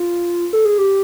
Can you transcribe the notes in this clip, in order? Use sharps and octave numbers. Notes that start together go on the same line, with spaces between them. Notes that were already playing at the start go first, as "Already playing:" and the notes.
Already playing: F4
A4
G#4
G4